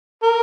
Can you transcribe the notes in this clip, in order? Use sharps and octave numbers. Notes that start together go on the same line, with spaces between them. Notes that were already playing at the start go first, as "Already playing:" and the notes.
A#4